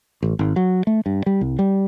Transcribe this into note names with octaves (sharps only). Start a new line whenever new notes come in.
A1
G#1
F#3
A3
G2
G3
C2
G3